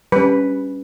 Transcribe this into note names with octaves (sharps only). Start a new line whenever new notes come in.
G3 C#4 B4